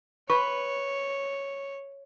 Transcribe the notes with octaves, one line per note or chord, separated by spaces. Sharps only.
B4 C#5 C#6